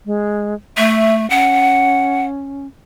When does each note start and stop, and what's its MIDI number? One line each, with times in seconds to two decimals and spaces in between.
0.06 0.54 56
0.77 1.28 57
0.77 1.15 76
1.30 2.67 61
1.30 2.24 78